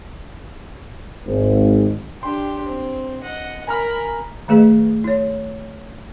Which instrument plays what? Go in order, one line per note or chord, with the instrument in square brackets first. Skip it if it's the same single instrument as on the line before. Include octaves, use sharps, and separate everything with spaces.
[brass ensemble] G#1
[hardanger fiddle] D4 G4 [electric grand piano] C6
[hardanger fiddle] C4
D#5 F#5
[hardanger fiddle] A#4 B5 [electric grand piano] G#5 A#5 F6
[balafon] D#3 A3 G#4 B4 D#5
E4 C#5